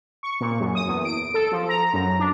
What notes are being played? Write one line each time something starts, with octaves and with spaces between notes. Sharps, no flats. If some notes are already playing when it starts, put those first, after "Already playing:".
C#6
A#2
F#2
D#6
E2
D7
A4
F3
A#5
F#2
D4